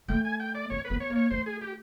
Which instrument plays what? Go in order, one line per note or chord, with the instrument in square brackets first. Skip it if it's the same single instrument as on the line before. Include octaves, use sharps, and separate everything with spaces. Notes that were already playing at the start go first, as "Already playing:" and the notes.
[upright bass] A3 [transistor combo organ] G5
[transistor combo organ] G#5
G5
D5
[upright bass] C4 [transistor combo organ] C#5
[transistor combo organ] B4
[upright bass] B3
[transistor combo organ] C#5
[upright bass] A#3
[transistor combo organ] C#5
[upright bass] A3 [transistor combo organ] C5
[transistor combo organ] G#4
G4